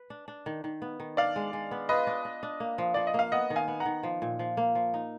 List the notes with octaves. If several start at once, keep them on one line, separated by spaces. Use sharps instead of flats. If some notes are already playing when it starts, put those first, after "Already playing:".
Already playing: B4
D4
D4
D#3
D#3
B3
D#3
D4 D5 F5
G#3
G#3
B3
F4 B4 D#5
D4
D4
D4
A#3
F3
F3 D5
D#5
A#3 F5
B3 D#5 F#5
D#3
F5 G#5
B3
F#5 A#5
D#3
F3
A#2
F3
A#3
F3
D#4